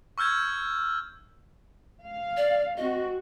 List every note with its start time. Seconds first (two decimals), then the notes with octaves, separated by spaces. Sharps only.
0.18 C#6 E6 F6 G6 G#6
2.03 F5
2.37 D5
2.77 C4 F#4 D#5